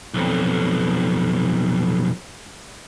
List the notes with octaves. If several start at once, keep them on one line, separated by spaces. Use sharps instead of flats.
B1 F2